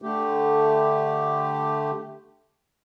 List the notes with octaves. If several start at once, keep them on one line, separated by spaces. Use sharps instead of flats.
D3 A3 G4